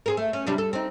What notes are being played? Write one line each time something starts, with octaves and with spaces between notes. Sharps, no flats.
C4 G#4 A#4
A3
C#4
C3 G3 D4
A4
C4 D#4